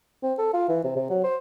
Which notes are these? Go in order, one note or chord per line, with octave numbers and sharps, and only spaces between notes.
C4
A4
F4
E3
C3
C3
F#3
C5